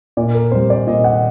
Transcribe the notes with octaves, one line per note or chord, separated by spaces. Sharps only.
A#2 D5
A#4
G3 C4 C5
D5
A#2 D#5
F#5